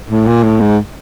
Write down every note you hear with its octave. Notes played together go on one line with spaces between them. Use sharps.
A2
A#2
A2
G#2